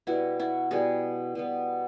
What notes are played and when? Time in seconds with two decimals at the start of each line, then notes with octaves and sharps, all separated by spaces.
0.07 B2 G3 B3 E4 F#4
0.39 E4 F#4
0.71 B2 G3 B3 F#4 G#4
1.35 B2 G3 B3